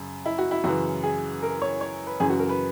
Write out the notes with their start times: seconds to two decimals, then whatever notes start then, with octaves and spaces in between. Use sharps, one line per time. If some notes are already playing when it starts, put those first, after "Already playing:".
Already playing: F#2 C#3
0.26 E4
0.38 F#4
0.51 E4
0.64 F#2 C#3 E3 F#4
1.03 G#4
1.43 A#4
1.62 C#5
1.81 C#5
2.07 B4
2.20 F#2 C#3 E3 G#4
2.30 F#4
2.39 A#4
2.49 B4